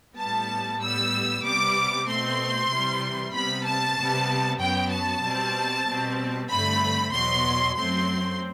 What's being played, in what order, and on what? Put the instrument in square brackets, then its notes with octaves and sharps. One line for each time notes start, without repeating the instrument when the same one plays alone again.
[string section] A2 G3 B3 A5
A2 G3 B3 E6
C3 G3 B3 D6
B2 A3 C4 C6
C3 E3 G3
C3 G3 B3 B5
A5
C3 G3 B3
F#2 F#3 B3 G5
A5
B2 G3 C4
B2 G3 C4
G2 D3 A3 C4 B5
E2 B2 F#3 C6
F#2 F#3 A3 C4 C6